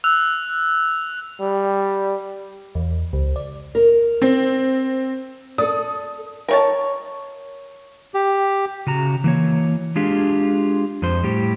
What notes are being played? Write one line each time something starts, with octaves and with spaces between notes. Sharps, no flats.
E6 F#6 F7
G3
E2
C#2
D5
A#4
C4
A4 D5 D#6
A#4 C#5 A5
G4
C#3 F#4 A#5
E3 A#3 C#5
G#3 D4 F4 G4 G#4
F2 C5
A2 G3 G4